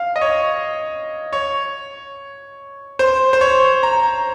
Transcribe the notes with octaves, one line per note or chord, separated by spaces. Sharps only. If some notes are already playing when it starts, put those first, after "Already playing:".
Already playing: F5
D#5
C#5
C#5
C5
C5
C#5
A#5